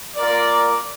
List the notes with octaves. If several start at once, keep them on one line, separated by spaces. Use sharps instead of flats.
A#3 F4 A#4 D5